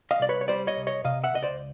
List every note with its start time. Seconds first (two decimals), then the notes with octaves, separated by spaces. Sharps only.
0.11 D#5 F5
0.20 C2 D5
0.29 B4 C#5
0.41 C#5
0.48 G3 C5 D5
0.67 C#5 D#5
0.77 C2
0.87 C#5 D#5
1.05 C3 D#5 F5
1.24 E5 F#5
1.33 C#2 D#5
1.43 C5 D5